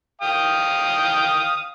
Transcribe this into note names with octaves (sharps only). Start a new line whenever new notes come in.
F5 G5 D#6